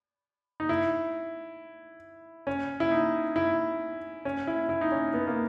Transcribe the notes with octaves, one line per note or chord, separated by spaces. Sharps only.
D#4
E4
C#4
E4
D#4
E4
C#4
E4
E4
D#4
C#4
B3
A#3